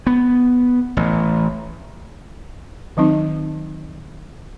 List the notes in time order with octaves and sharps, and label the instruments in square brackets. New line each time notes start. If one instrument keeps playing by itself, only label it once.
[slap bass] B3
A1
[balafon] D#3 F#3 C4 D#4